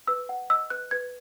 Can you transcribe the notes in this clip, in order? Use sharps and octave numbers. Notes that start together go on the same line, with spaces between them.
B4 E6
F#5
D#5 E6
B4 F#6
B4 G#6